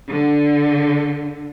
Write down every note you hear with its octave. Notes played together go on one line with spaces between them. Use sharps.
D3